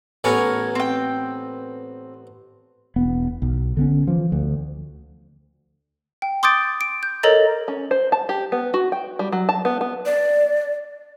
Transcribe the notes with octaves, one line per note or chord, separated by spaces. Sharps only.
A1 B3 A4 A#4 C#5 G#5
C4 G5
E1 B3
B1
D3 B3 C#4
E3 F3
D2
G5
C6 D6 D#6 G6 A6 D7
D7
G6
A4 A#4 C#5 D#5 A#5 A6
C#4
C5
A5
G4
B3
F#4
G5
G3
F#3
A5
B3
B3
D5